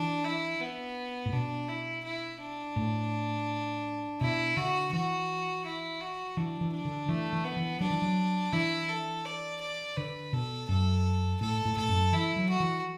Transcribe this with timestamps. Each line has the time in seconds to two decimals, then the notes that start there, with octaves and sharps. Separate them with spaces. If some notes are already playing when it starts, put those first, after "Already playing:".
Already playing: E3 D4
0.24 E4
0.60 B3
1.26 A2
1.33 B2 D4
1.69 E4
2.04 E4
2.41 D4
2.76 A2
4.21 B2 E4
4.57 D3 F#4
4.93 E3 F#4
5.65 E4
6.01 F#4
6.37 E3 D4
6.61 E3
6.72 D4
6.85 D3
7.09 E3 A3
7.33 E3
7.45 B3
7.56 E3
7.81 F#3 D4
7.90 E3
8.02 F#3
8.53 E3 E4
8.88 A4
9.25 D5
9.61 D5
9.96 D3 B4
10.33 B2 A4
10.68 F#2 A4
11.41 A2 A4
11.65 A2
11.77 A2 A4
11.89 F#2
12.13 E3 E4
12.36 F#3
12.49 F#4
12.60 E3